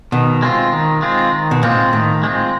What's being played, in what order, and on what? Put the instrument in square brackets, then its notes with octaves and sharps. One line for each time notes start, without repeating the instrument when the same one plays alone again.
[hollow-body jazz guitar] B2 [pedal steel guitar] D#3
[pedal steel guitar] G#3 C4 F4
D#3
G#3 C4 F4
D#3
[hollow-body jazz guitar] B2
[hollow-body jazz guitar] A#2 [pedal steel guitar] G#3 C4 F4
[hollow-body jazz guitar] A2 [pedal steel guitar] D#3
[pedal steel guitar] G#3 C4 F4